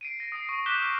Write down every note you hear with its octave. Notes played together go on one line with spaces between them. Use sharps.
C7 D7 D#7
A#6
D#6 C7
C#6
D6 F#6 G6 B6 E7 G7
D6 E6 F6